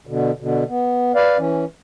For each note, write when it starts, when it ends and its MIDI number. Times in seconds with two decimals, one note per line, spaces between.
0.07 0.31 47
0.07 0.31 50
0.40 0.64 47
0.40 0.64 50
0.69 1.12 59
1.15 1.37 71
1.15 1.37 74
1.15 1.37 77
1.38 1.65 52
1.38 1.65 61